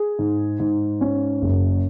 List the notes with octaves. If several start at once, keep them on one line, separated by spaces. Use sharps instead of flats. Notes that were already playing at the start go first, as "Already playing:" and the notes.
Already playing: G#4
G#2
G#2
C#4
F#1